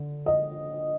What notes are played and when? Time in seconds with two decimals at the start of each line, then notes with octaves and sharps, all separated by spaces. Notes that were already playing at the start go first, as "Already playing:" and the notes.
Already playing: D3
0.26 D#5